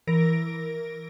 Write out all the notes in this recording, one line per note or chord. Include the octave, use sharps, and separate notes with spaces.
E3 A#4 A#6 D7